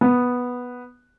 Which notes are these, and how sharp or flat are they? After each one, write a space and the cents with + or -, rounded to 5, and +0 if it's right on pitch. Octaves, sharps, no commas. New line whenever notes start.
B3 -5